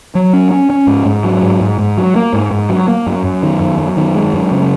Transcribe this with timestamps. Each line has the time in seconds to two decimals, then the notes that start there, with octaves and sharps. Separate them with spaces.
0.15 F#3
0.33 C#4
0.51 C#4
0.70 C#4
0.87 G#2
1.05 G#2
1.24 F#3
1.42 G#2
1.61 G#2
1.79 G#2
1.97 F#3
2.16 A#3
2.33 G#2
2.51 G#2
2.70 F#3
2.88 A#3
3.07 F#2
3.24 F#2
3.43 D#3
3.61 F#2
3.79 F#2
3.97 D#3
4.15 G#3
4.33 F#2
4.51 C#3